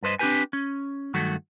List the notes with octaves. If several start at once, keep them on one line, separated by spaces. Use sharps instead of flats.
G2 B4 C5 D#5
C4 D4 F#4 G4 B4 G#5
C#4
G2 D#3 F#3 A3 F#4